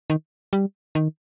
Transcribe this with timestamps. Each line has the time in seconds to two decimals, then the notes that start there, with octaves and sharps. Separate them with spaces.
0.10 D#3
0.53 G3
0.95 D#3